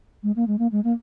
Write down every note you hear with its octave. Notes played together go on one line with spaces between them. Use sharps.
G#3
A#3
G#3
A#3
G#3
A#3